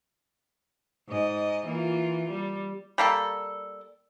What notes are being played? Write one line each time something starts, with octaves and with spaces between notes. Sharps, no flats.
G#2 D#5
E3 A#3 F4
G3
G3 A#3 A4